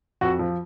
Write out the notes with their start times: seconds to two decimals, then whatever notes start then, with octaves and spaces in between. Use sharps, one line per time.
0.21 F2 F#4
0.39 F3